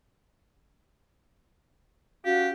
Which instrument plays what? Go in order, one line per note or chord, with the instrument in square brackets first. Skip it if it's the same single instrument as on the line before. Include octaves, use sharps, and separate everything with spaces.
[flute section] C#4 F#4 F5 [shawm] G4